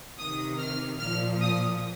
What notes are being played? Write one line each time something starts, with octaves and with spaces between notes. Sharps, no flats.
C3 D#3 D#6
F6
A#2 F3 F6
D#6